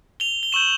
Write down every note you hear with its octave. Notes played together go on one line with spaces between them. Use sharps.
F7 G7
G7
C#6 E6 G6 E7 F#7